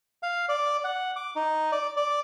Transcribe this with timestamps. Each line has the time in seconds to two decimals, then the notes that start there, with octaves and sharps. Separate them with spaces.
0.23 F5
0.49 D5
0.84 F#5
1.16 D6
1.36 D#4
1.72 D5
1.97 D5